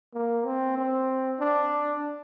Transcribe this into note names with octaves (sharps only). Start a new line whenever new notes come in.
A#3
C4
C4
D4